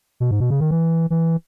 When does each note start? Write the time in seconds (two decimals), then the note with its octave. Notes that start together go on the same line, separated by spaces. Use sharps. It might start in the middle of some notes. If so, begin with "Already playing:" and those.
0.20 B2
0.31 G#2
0.40 B2
0.50 C#3
0.60 D#3
0.71 E3
1.10 E3